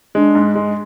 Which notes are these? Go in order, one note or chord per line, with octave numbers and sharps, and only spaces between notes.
G#3 D4
G#2
G#3